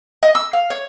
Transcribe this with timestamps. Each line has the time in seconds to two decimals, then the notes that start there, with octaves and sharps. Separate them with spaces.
0.23 D#5
0.35 E6
0.53 F5
0.70 C#5